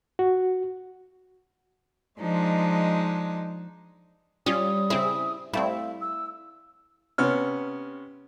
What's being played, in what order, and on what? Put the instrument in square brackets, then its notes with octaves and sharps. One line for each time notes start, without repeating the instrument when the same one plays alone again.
[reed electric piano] F#4
[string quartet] F3 G#3 D4 D#4
[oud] G3 [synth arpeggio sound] C#4 F4 [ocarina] D#6
[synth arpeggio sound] C#3 C4 G#4 [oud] E4
[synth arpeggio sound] G3 A3 C4 [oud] E4 [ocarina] F5
[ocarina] E6
[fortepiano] C3 B3 C#4 F6